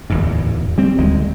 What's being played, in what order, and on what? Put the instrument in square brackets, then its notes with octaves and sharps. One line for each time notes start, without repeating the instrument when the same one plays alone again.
[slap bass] D1 E2 G#2
G3 C4
D#1 D2 D#3 G#3